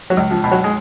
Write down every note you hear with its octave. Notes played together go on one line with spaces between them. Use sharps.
F#3
C#2
F3
B2
F#3
G#3